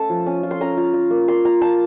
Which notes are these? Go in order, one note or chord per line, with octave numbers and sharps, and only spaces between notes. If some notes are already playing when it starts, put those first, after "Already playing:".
Already playing: A3 C#4 A4 A5
F3
C#4
F4
C6
C#4 A#5
F4
F4
A#3
A#3 C6
F4 A#5
F4 A5